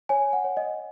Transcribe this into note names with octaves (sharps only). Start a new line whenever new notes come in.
C#5 G#5
F#5
C#5
D#5